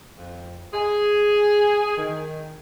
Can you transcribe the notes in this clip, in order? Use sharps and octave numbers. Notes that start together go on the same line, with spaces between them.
F2
G#4
D#3